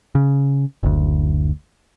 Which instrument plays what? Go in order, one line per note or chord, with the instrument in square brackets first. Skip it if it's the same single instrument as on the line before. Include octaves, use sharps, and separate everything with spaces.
[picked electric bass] C#3
F#1 D2